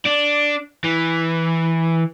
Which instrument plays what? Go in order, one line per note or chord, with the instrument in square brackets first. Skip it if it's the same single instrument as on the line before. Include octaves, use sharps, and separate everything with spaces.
[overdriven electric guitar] D4
E3